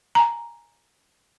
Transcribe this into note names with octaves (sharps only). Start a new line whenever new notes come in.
G#5 A#5